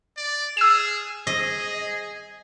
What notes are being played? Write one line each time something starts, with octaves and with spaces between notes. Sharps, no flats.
D5
G#4 E6 E7
G#4 D#5